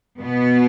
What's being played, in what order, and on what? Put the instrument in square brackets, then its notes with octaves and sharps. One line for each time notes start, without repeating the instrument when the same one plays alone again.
[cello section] B2 B3